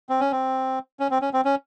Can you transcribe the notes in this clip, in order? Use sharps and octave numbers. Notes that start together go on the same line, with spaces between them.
C4
C#4
C4
C#4
C4
C#4
C4
C#4